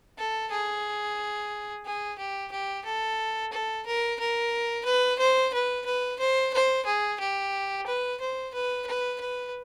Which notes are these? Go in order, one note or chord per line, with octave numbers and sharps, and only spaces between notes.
A4
G#4
G#4
G4
G4
A4
A4
A#4
A#4
B4
C5
B4
B4
C5
C5
G#4
G4
B4
C5
B4
B4
B4